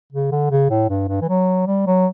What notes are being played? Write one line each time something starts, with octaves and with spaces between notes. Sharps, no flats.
C#3
D3
C#3
A2
G2
G2
E3
F#3
G3
F#3